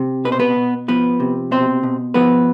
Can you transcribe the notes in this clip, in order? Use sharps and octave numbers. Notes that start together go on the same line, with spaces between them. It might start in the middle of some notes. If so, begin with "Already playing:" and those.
Already playing: C3
B2 B4
C5
B3 B4
B2
F3 B3 B4
C3
B2 C4 C5
B2
F3 B3 B4